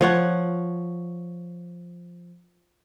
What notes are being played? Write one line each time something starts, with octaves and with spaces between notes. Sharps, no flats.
F3 C#5 F#5